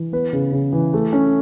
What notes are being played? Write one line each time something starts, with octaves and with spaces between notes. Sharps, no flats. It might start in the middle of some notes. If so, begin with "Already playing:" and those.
Already playing: E3
B3 B4
C#3
C#3
E3
A3
C#4